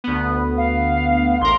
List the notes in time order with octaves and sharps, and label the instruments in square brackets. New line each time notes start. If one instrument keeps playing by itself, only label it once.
[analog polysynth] D2 B3
[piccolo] F5
[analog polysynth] A1 A#4 [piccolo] C6